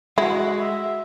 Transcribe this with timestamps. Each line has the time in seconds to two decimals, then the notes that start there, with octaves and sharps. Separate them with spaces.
0.18 G#3 E4 F#4
0.59 E5